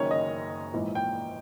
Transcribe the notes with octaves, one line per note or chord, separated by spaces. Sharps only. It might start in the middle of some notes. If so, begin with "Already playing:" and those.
Already playing: F#1 F#2 D#3 C#5
D#5
A#1 G#2 E3
G5